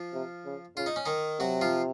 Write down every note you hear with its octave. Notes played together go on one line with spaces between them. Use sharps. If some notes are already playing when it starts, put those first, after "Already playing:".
Already playing: F3 F4
C3
C#3
C#3 F4
D#4
C#4
D#3 D#4
C3 F#3 F#4
F3 F4